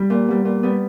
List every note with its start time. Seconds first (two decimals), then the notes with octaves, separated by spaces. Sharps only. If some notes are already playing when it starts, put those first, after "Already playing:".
Already playing: G3
0.10 A#2
0.28 G3 B3
0.45 A#2
0.63 G3 B3